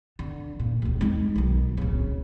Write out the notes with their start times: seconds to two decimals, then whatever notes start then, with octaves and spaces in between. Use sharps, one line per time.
0.19 D3
0.59 A#2
0.82 F1 D2
1.01 G#3 D#4
1.36 B1 D#3
1.77 D1 C#3